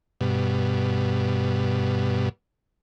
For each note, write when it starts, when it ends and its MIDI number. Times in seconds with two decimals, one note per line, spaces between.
0.21 2.29 43
0.21 2.29 47